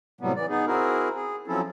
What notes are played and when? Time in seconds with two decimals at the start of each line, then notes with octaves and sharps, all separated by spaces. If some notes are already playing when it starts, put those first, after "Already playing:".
0.21 A2 C3 F#3 G3 B3
0.36 E3 D5
0.49 B3 D#4 G#4
0.67 C4 E4 F#4 G#4 A#4
1.15 G#4
1.48 F3 F#3 C4 C#4 E4 A4